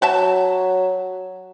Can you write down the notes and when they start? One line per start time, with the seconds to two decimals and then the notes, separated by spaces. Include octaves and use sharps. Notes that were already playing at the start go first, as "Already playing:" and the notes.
0.02 F#3 F#4 E5 A5